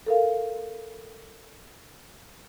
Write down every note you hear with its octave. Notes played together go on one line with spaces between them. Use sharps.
A4 A#4 F5